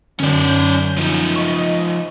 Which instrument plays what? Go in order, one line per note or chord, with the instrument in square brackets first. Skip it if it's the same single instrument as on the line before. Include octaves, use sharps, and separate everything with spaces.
[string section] F#2 G6 [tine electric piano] D3 [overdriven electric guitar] C#4 D5
[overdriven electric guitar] F3 D#4
[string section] D#5 [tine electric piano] C#6